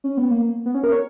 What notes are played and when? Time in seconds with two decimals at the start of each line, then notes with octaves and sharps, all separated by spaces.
0.04 C#4
0.17 B3
0.31 A#3
0.66 B3
0.74 C#4
0.83 A#4
0.92 C#5